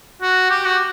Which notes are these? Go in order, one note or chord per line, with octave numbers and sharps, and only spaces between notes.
F#4
G4
F#4